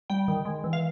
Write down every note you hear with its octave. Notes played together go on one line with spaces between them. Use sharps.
G3 G5
D#3
G#3
E3
F5